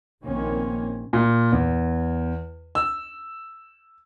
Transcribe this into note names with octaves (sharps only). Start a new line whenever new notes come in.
A#1 D#3 A#3 C4 C#4
A#2
E2
E6